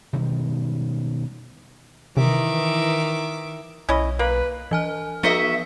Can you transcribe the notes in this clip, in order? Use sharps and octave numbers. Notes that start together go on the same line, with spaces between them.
B2 D#3 G3 G#3
C3 D#3 E3 E5 D6
B1 C#4 E4 D#5
A#3 B4
E3 G#5 F6
F3 B3 F#4 D#5 E5 B6